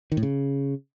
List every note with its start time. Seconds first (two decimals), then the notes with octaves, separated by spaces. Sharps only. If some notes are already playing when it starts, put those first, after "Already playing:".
0.12 D#3
0.17 A2
0.23 C#3